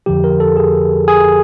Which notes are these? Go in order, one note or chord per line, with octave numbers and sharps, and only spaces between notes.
F2 D3 F3 G4
A#4
A4
G#4
G#4